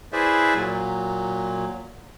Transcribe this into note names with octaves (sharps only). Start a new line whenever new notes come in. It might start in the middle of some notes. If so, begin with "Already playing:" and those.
E4 G#4 B4 C5 D5 E5
A#2 F#3